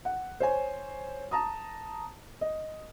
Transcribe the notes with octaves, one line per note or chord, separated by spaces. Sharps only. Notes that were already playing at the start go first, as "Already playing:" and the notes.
F#5
C5 C#5 G#5
A5 A#5 D#6
D#5